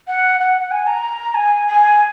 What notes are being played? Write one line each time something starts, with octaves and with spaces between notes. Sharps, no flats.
F#5
F#5
G#5
A#5
G#5
G#5